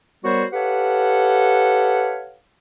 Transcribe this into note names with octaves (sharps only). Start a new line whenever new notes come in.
G3 B3 F#4 A#4 C5 C#5
G4 A4 B4 C#5 F5 F#5